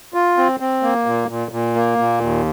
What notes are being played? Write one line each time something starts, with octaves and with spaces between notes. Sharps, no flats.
F4
C4
C4
A#3
A#2
A#2
A#2
A#3
A#2
D#2